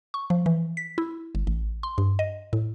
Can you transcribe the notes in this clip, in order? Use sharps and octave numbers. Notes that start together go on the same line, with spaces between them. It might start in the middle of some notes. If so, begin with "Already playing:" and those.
C#6
F3
E3
B6
E4
G1
A1
C6
G2
D#5
A2